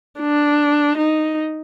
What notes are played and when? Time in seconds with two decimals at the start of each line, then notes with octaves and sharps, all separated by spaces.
0.19 D4
0.97 D#4